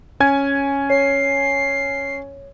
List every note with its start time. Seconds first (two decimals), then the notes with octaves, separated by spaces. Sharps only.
0.20 C#4 G#5 G#6
0.90 C#5 C7